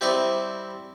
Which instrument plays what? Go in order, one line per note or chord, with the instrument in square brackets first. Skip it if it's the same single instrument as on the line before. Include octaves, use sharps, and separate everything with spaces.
[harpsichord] G3 C4 E4 D5 D#5 C#6